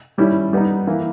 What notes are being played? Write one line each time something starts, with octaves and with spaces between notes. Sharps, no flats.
D#3 G3 C#4 E4
G3 B3 D#4
E3 A#3 E4